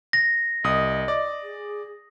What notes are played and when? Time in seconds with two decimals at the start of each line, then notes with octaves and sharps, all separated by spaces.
0.13 A#6
0.64 C2 D#5 D#6
1.08 D5
1.43 G#4